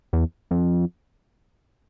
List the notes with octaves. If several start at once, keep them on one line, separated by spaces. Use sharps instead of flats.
E2
F2